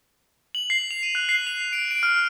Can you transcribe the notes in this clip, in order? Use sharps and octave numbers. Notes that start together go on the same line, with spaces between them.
F#7
C7
F7
D#7
F#6
C7
F7
D7
D7
F6